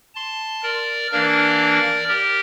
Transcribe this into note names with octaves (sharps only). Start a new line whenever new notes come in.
A5 C6
A#4 D5
E3 A#3 D4 A#4 D5
G4 A#4